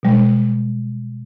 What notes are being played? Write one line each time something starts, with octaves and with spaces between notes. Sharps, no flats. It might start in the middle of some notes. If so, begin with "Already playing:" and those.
B2 G3 G#3